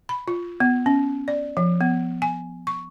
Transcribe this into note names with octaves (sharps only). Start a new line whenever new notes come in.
B5
F4
B3
C#4
D5
F3
B3
G#5
C#6